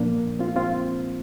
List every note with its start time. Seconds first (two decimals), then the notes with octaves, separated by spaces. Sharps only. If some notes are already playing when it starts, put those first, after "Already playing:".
Already playing: A#2 F3 A#3 D4
0.39 C4 F4
0.56 C4 F4